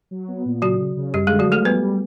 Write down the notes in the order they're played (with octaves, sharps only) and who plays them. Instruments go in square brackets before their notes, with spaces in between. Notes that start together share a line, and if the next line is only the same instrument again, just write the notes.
[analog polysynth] F#3
B3
A#2
[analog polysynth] C#3 [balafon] F#3 F#4
[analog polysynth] C#3
C#3
[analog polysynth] F#2 [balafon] G3 G4
[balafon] G#3 G#4
[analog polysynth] D3
[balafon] F#3 F#4
[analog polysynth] F3 [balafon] A3 A4
[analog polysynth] G3 [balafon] B3 B4
[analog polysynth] G3